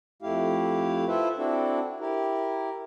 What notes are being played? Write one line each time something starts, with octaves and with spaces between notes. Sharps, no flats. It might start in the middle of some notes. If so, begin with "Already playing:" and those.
F2 A3 E4 G4 F5
E4 F4 A4 B4 C5 E5
C4 D4 E4 F#4 A4
E4 G4 A#4